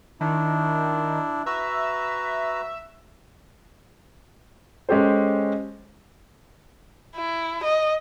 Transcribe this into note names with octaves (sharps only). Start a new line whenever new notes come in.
D#3 D4 E4
F#4 B4 E5 A#5
G#3 C#4 G4 A4 C5
E4
D#5